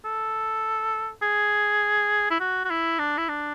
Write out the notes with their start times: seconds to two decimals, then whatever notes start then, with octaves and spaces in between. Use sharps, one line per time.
0.05 A4
1.23 G#4
2.31 E4
2.40 F#4
2.65 F#4
2.70 E4
2.99 D4
3.18 E4
3.29 D4